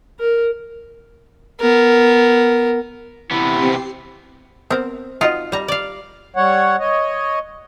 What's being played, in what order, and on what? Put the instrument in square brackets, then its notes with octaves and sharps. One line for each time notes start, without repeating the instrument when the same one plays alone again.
[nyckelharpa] A#4
B3 A#4
[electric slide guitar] C3 E3 B3 [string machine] C4 G4 C7 [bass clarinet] E4
[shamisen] B3 A#4 C5 [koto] C4
[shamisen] D#4 F#4 D#5 [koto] F4
[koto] G3 A#5
D5 F5
[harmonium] G3 C#5 F#5
C#5 D#5